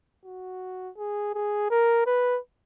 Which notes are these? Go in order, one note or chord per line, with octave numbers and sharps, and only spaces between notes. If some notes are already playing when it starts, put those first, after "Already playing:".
F#4
G#4
G#4
A#4
B4